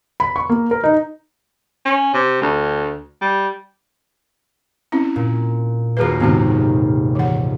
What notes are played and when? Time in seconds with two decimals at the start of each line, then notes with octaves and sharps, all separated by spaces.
0.20 B5
0.36 C#6
0.49 A#3
0.71 A#4
0.84 D#4
1.85 C#4
2.14 C3
2.42 D2
3.21 G3
4.92 C4 C#4 E4
5.16 A#2
5.97 D#1 A#3 F#4 G#4 B4 C7
6.20 G#2 C3 D#3 B3 C4 F#4
7.15 E3 F#5